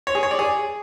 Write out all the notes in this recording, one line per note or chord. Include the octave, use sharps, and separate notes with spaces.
C#5
G#4
C#5
D5
G#4